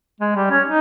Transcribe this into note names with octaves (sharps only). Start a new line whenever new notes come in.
G#3
G3
C#4
D#4